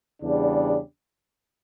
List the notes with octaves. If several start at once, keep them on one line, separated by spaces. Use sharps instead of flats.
E2 C#3 G3 D4